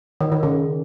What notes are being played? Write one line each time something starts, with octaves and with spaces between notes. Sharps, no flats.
D#3
D#3
C#3